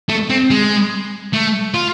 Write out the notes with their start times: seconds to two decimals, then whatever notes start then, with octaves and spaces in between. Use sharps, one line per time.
0.09 A3
0.29 C4
0.50 G#3
1.33 A3
1.74 F4